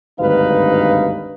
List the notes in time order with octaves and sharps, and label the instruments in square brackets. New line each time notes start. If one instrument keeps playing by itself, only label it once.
[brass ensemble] G#1 D2 G2 D#4 B4 F5